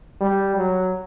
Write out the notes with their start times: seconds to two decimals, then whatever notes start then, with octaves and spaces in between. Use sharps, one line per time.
0.21 G3
0.56 F#3